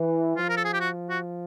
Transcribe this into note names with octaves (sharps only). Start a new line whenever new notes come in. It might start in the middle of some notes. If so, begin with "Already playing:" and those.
Already playing: E3
F3 F4
A#4
A4
G#4
G4
F#4
F#4